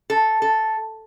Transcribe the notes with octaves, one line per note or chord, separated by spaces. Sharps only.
A4
A4